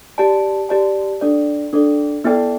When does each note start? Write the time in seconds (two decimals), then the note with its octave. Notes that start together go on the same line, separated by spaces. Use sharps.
0.18 G4 D5 A5
0.69 G4 D5 A5
1.21 D4 A4 D5
1.73 D4 A4 D5
2.24 B3 E4 A4 D5 G5